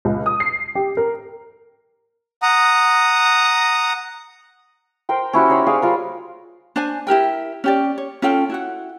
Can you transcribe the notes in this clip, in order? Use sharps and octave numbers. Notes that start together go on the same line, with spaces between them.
C#2
D#6
C7
G4
A#4
F#5 A#5 D#6
A#4 C5 G5
C#4 E4 F#4 G4
D#4 C5 C#5 B5
G#4 D5 F5
G3 F4 A#4
D4 C5 G#5
E4 G4 A#4 G5
C#4 G4 D5
C#5
C#4 F4 A4 G5
E4 F#4 F#5